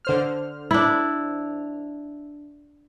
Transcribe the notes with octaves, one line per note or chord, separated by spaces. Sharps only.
D3 C5 F6
D4 E4